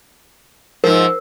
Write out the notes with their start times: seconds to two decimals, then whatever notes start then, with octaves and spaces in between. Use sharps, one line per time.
0.84 G#2 F3 A#4 C5 E6